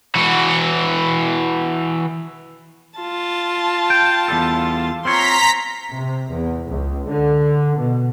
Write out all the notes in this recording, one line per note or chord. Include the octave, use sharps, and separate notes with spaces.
E3 F#4
F4 A5
G5
E2 G3 A4
C4 F4 C#5 A#5 C6 B6
C3
E2
C#2
D3
B2